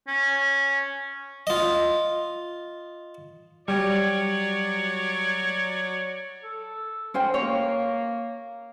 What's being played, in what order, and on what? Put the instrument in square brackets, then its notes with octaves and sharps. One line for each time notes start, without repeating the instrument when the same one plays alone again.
[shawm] C#4
[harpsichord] F4 D#5
[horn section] F#3 C#5 D5 [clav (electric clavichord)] G3
[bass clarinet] A4
[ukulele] C#4 C5 G5
[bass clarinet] A#3 [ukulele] C#5